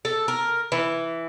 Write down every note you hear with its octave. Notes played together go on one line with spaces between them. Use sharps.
A4
A#4
E3